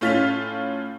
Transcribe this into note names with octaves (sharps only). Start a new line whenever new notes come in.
A2 C#4 F4 A6 B6 F7